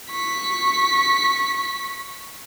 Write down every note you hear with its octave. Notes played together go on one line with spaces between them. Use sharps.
C#6 B6